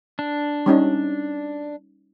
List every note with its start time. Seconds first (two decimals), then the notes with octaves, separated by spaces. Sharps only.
0.19 D4
0.66 G3 C#4 D#4